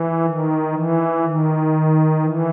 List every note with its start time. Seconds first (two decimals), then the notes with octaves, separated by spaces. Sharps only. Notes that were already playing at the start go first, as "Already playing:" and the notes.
Already playing: E3
0.23 D#3
0.73 E3
1.22 D#3
2.22 E3